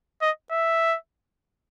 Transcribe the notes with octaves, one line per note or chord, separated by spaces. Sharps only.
D#5
E5